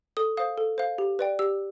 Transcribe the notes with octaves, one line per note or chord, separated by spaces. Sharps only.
A4 D#6
C5 F5 D#6
A4
C5 F5
G4
B4 D5 G5
G4 E6